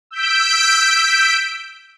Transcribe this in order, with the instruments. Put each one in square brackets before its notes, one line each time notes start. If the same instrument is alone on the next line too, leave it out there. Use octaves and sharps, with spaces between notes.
[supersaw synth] E6 G6 B6 D7